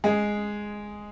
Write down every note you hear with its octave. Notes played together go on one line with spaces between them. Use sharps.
G#3 G#4